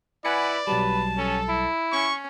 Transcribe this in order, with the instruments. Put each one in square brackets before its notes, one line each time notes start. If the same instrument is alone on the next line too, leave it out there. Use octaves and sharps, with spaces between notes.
[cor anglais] E4 [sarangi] B4 [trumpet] D5 [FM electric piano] F#5 G#5 C#7
[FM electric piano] B1 F#3 G3 [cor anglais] B4 [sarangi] A5
[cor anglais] C#4 [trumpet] A4
[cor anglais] E4
[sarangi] C#4 [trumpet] C#6